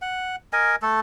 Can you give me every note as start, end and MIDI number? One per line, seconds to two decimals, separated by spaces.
0.02 0.36 78
0.53 0.76 70
0.53 0.76 75
0.53 0.76 80
0.82 1.00 57
0.82 1.00 69